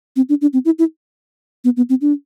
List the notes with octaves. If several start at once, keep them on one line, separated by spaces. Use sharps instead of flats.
C4
D4
D4
C4
E4
E4
B3
B3
C4
D4